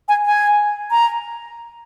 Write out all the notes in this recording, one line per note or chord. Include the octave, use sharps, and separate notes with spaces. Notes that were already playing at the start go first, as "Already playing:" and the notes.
G#5
G#5
A#5